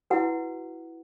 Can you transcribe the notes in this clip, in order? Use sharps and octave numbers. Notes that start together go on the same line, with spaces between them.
E4 F#4 B4 F#5